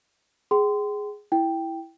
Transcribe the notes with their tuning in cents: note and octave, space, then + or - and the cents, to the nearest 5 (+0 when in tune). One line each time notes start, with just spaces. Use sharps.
G#4 +0 G5 -35 C6 -25
E4 +0 G5 +0